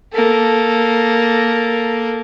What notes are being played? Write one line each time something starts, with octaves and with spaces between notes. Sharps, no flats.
A#3 A4